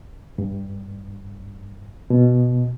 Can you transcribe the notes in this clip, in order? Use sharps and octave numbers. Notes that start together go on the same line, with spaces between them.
G2
B2